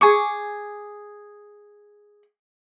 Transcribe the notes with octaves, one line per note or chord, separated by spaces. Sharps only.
G#4 G#5 C#6 D6 C#7